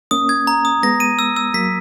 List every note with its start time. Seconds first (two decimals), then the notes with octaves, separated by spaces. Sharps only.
0.11 A#3 C#4 D#6
0.29 G#6
0.47 A#5
0.65 D#6
0.83 G#3 B3 A#6
1.00 D#7
1.19 E6
1.36 E6
1.54 F#3 A#3 B6